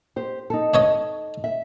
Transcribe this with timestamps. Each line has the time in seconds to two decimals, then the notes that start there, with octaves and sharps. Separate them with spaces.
0.16 G4 C5
0.50 D#4 A4
0.74 D4 C#5 D#5
1.44 E5